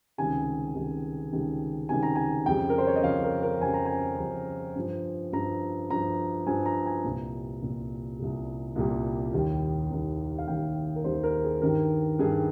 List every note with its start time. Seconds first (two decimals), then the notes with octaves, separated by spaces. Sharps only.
0.18 C#2 C3 D#3 G3 G#5
0.75 C#2 C3 D#3 G3
1.33 C#2 C3 D#3 G3
1.89 C#2 C3 D#3 G3 G#5
2.03 A#5
2.15 G#5
2.46 F2 C#3 G3 G5
2.70 A#4
2.78 C5
2.87 C#5
2.96 D#5
3.03 F2 C#3 G3 F5
3.24 A#4
3.42 A#4
3.61 F2 C#3 G3 G#5
3.74 A#5
3.86 G#5
4.18 F2 C#3 G3 A#5
4.76 G2 F3
5.33 G2 F3 A#5
5.90 G2 F3 A#5
6.47 G2 F3 G#5
6.66 A#5
6.86 G#5
7.04 C2 A#2 G3
7.62 C2 A#2 G3
8.19 C2 A#2 G3
8.75 C2 A#2 G3
9.33 D#2 D#3 G3
9.91 D#2 D#3 G3
10.38 F5
10.48 D#2 D#3 G3 G5
10.96 A#4
11.04 D#2 D#3 G3 C5
11.23 A#4
11.44 G#4
11.62 G2 D#3 G3 A#4
12.19 G2 D#3 G3 G#4